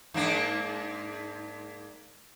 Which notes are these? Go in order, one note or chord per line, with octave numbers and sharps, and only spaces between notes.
G#2 A#3 D4